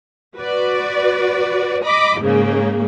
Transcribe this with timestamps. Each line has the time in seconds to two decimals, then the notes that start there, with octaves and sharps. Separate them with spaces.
0.36 F#4 B4 D5
1.85 D#5 B5 D6
2.20 G#2 C#3 G#3 A#3